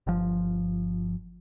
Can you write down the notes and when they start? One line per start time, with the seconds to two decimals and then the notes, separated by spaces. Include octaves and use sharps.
0.07 G1 F3